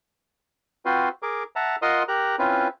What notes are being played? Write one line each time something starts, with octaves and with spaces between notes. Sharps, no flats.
C4 F4 F#4 B4 C5
G#4 A#4 D6
E5 F#5 A5 A#5
F4 A#4 D#5 F#5 C6 D#6
G4 A#4 A#5 F#6
C4 C#4 E4 F4 B4